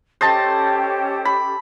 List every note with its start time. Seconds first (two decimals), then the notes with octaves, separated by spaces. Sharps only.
0.21 C#4 G4 A4 C5 D#5 A5
1.25 B5